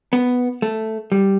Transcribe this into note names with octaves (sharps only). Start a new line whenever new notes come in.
B3
A3
G3